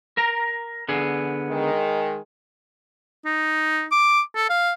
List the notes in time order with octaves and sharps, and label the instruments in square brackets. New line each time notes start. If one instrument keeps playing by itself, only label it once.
[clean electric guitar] A#4 A#5
D3 B3 G#4
[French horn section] D#3 G#3
[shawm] D#4
D6
A4
F5